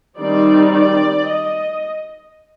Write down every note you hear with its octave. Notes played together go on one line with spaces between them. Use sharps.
D#3 G3 C4 D#4 D5
D5
D#5